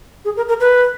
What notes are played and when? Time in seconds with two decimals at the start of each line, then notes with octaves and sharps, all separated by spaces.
0.25 G#4
0.37 A#4
0.49 A#4
0.60 B4